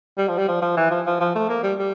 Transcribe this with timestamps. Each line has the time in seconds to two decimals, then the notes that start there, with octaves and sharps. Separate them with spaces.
0.18 G3
0.28 F3
0.37 G3
0.48 F3
0.62 F3
0.77 E3
0.91 F3
1.06 F3
1.20 F3
1.35 A3
1.49 A#3
1.64 G3
1.79 G3